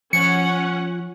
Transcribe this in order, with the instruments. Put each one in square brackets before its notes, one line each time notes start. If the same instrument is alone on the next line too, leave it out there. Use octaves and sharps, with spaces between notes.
[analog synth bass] F3 [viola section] C#4 F#5 [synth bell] C#7